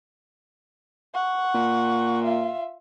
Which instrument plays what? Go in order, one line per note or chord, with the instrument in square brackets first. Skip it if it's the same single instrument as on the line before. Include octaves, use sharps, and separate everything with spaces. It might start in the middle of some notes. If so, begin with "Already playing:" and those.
[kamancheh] F#5 C#6
[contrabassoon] A#2
[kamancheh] F4 E5